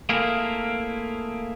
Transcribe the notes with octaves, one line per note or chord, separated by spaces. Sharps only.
A3 A#3 C4 E4 G#4 A#4